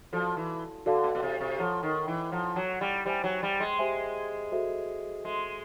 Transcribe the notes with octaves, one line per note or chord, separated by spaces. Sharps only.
F3 F#4 A4 D5 F5 A5
E3
D3 F#4 A4 D5 F5 A5
B2
B2
C3
C3
F3 A4 C#5 F#5 A#5
D#3
E3
F3 A4 C#5 F#5 A#5
F#3
G3
G3 G4 C5 E5 G#5
F#3
G3
G#3
G4 C5 E5 G#5
F#4 A4 C5 E5
G#3 F#4 A4 C5 E5